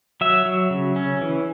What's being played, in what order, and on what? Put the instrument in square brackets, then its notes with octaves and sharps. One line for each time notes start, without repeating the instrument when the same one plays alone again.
[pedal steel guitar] F#3 E5
F#3
C#3
C#4
E3